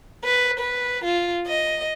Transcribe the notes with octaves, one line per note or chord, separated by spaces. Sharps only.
B4
B4
F4
D#5